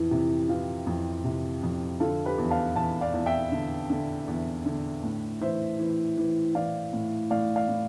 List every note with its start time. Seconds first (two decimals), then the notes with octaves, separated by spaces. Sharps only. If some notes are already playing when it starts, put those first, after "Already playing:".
Already playing: F2 E3
0.11 C3
0.49 E3 F4
0.86 F2
1.24 C3
1.63 F2
2.00 D3 F4 A4
2.25 G4 B4
2.38 E2
2.50 F5 A5
2.76 E2 F5 A5
3.01 D5 F5
3.14 E2
3.26 E5 G5
3.52 D3
3.90 D3
4.28 E2
4.66 D3
5.03 A2
5.41 E3 C5 E5
5.79 E3
6.17 E3
6.55 E3 D5 F5
6.93 A2
7.30 A2 D5 F5
7.56 D5 F5
7.68 A2